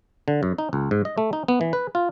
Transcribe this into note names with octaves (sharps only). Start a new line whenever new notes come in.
D3
F#2
D#4
C#2
G#2
D#5
A3
D#4
B3
E3
B4
F4